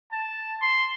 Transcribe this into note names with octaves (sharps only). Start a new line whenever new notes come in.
A5
C6